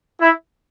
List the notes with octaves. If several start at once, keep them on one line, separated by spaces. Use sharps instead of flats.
E4